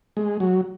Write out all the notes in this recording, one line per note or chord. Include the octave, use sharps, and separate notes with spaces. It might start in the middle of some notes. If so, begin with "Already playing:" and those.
G#3
F#3